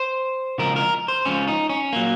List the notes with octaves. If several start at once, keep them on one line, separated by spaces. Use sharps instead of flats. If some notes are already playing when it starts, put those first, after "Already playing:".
Already playing: C5
C#2 C#3 F3 A#4
A#4
C5
C#2 C#3 F3 C#4
D#4
C#4
A#2 F#3 A#3